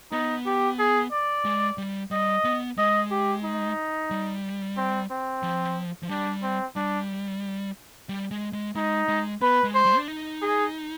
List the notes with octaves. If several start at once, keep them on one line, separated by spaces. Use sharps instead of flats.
B3 D#4
G4
G#4
D5
G#3
G3
G3 D#5
B3
G#3 D#5
G4
D#4
G3
C4
C4
F3
F3
G3 D4
C4
G3 D4
G3
G#3
G#3
G#3 D#4
G#3
B3 B4
G#3
C5
G3
D4
D#4
G#4